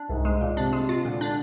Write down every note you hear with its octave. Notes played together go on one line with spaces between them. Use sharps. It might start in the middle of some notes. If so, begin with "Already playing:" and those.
Already playing: D4
C2 G#2
G#3
A#2
C3 D4
G#3
F4
A#2 D3
D4